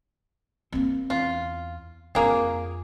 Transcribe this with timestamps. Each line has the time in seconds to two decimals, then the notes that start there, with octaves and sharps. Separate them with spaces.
0.72 A#3 C4
1.10 E2 F4
2.15 F2 A#3 D4 G#4